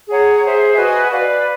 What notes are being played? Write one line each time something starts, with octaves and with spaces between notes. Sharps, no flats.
G#4 C#5 F#5 A#5
G#4 C5 E5
F#4 B4 D#5 G#5
B4 D5 F5